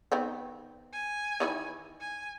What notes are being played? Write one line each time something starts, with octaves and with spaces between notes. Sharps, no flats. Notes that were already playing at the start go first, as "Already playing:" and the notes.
D#3 B3 C4
G#5
D#3 E3 E4
G#5